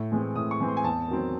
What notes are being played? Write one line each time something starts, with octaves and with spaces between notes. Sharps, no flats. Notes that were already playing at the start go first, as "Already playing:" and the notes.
Already playing: A2
E3 G#3 C4
A2 D#6
C#6
E3 G#3 C4
C6
G#5
E2 A5
D#3 F#3 C4